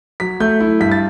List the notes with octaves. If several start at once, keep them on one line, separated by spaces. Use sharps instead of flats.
F#3 B6
A3 G6
E4
G2 B6
A6